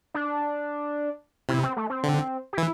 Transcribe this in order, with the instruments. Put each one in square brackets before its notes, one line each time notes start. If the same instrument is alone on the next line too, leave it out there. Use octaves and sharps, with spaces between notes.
[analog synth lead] D4
[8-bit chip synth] C3 [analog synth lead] E4
[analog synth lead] C4
A3
C4
[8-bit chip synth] D3
[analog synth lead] G4
[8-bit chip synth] E3 [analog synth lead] E4